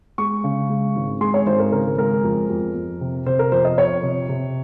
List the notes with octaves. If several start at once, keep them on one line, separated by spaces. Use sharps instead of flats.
G#3 C#6
C#3
G#3
G#1
G#3 C6
C#5
G#1 C5
A#4
C#3 A#4
G#3 A#4
F2
F2
F2
C3
C3 C5
A#4
F2 C5
D#5
F2 C#5
C3
C3